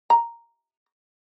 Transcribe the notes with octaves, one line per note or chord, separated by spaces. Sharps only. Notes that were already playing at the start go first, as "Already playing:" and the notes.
A#5